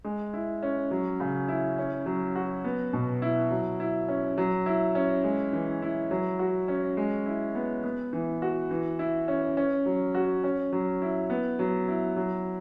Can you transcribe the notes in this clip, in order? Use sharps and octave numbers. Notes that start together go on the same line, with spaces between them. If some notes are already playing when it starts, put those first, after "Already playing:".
G#3
E4
C#4
F#3
C#3
E4
C#4
F#3
F#4
B3
B2
E4
F#3
E4
C#4
F#3
E4
C#4
G#3
E3
E4
F#3
F#4
C#4
G#3
E4
B3
B3
E3
F#4
E3
E4
C#4
C#4
F#3
F#4
C#4
F#3
E4
B3
F#3
E4
F#3